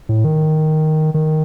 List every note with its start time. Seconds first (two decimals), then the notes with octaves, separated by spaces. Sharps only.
0.09 A2
0.24 D#3
1.14 D#3